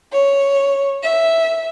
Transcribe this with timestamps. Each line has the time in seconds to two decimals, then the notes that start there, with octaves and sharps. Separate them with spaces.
0.12 C#5
1.03 E5